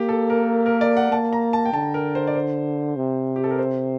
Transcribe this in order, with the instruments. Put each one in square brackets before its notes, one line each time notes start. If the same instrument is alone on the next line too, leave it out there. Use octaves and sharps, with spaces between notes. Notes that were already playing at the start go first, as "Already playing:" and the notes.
Already playing: [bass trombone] A#3 [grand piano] G4
[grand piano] A4
A#4
A#4
D5
F#5
[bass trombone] A#3 [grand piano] A5
[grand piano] A#5
A5
G5
[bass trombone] D3 [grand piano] A5
[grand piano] A#4
C5
D5
C5
[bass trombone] C3
[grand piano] G4
A4
A#4
C5